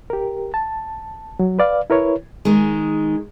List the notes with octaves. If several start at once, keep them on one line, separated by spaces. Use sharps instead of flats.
G4 A#4
A5
F#3
B4 D5 F5
E4 A#4 B4 C#5
D#3 G#3